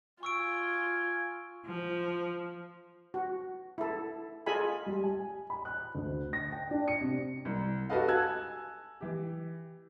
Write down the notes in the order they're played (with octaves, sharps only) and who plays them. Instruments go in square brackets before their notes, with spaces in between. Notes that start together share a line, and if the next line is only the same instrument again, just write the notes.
[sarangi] F4 [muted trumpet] G#5 [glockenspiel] C#6 E6 D7
[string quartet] F3
[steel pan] F#4
E4 A4
F4 G#4 A4 D#5 G#5 B5
[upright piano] G3
G#5
B5
F#6
D2
A#6
G5
D4
C#7
C3
C2
F#4 G4 A4 B4 D#5 F5
G#5 A5 E6 F#6 G#6
E3 G4